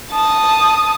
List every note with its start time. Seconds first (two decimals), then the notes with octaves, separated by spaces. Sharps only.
0.12 A5 D#6